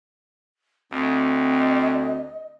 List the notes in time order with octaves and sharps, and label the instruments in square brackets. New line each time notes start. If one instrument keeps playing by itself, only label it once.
[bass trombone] D2 [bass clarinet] C4 [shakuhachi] D#5